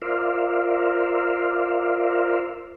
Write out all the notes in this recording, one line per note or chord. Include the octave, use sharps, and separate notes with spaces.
F4 A#4 C5 D5 E5 F5